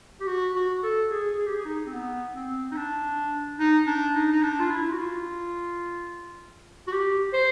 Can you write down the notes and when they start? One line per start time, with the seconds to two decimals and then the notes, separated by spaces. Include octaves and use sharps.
0.21 G4
0.27 F#4
0.55 F#4
0.83 A4
1.10 G#4
1.38 G#4
1.47 G4
1.55 G#4
1.65 D#4
1.87 C4
1.93 B3
2.35 C4
2.72 D#4
2.76 D4
3.60 D#4
3.87 D4
4.15 D#4
4.32 D#4
4.43 D4
4.60 F4
4.71 E4
4.92 F#4
4.98 F4
6.87 F#4
6.92 G4
7.34 C5